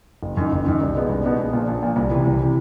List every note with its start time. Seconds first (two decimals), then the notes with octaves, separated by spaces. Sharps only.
0.23 F#1
0.37 F#2 D#3
0.52 F#1
0.66 F#2 D#3
0.81 C2
0.95 B2 G#3 B3 D#4
1.09 C2
1.24 B2 G#3 B3 D#4
1.39 A#1
1.53 A#2 F3
1.68 A#1
1.83 A#2 F3
1.96 C2
2.11 C3 E3
2.25 C2
2.40 C3 E3